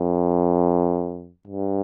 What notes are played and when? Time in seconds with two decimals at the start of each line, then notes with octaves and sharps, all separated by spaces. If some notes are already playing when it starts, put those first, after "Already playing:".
Already playing: F2
1.47 G2